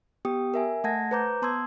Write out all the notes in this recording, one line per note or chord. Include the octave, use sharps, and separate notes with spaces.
B3 G4 G5 D#6
A#4 E5 G#5
A3 F#5 A5 G#6 A#6
B4 C5 A#5 D6 G6
B3 A5 C6 D#6 E6 G#6